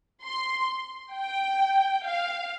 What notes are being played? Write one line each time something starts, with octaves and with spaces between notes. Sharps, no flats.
C6
G5
F5